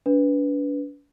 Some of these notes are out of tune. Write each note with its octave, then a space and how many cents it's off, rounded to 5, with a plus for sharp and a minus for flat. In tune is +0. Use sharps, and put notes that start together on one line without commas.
D4 -40 B4 +0